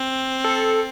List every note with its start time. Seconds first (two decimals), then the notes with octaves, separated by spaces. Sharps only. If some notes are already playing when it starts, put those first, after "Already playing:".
Already playing: C4
0.44 A4